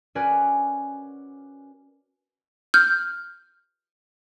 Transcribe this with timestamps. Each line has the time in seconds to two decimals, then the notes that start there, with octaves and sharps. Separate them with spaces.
0.15 C#4 F#4 A#4 B4 D5 G#5
2.74 F6 G6